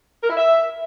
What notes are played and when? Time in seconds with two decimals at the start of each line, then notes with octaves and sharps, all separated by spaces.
0.22 A#4
0.30 E4
0.37 E5